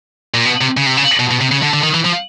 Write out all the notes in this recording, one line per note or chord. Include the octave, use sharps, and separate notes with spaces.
A#2
B2
C3
C#3
C3
C#3
B2
B2
C3
C#3
D3
D3
D#3
E3
F3